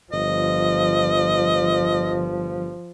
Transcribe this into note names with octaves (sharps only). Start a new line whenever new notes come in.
G1 F3 D#5